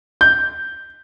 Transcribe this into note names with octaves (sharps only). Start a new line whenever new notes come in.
G6